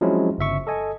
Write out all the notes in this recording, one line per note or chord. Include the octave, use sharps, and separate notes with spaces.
F3 F#3 G#3 C4 C#4 E4
G1 C#3 E5 C#6
A4 D#5 G#5